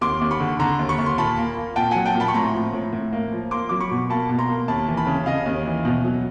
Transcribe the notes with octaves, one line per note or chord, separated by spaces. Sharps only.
D#2 C6 D6
D#2
B5 C#6
D3
D3 A#5 C6
D#2
B5 C#6
D#2
C6
A#2 A5 B5
A#3
A#3
A#2 G5 A5
F#3 F#5 G#5
G5 A5
A#2
A5 B5
C#6
A2 A#5 C6
F3
A2
A2
A#3
F3
A#3 C6 D6
F#3 D6
B5 C#6
B2
A#3 A5 B5
B2
A#5 C6
A#3
D#2 A5 B5
E3
A5 B5
C#3
C#3 D#5 F5
D#2
E3
B2
F#3